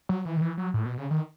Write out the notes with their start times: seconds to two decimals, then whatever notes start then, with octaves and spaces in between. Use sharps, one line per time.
0.09 F#3
0.25 E3
0.37 D#3
0.41 E3
0.58 F#3
0.74 A2
0.85 B2
0.98 C#3
1.11 D#3